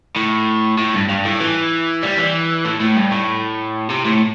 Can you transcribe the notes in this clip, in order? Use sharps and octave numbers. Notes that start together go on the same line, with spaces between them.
A2
A2
G2
G2
A2
E3
G3
E3
A2
A2
G2
A2
C3
A2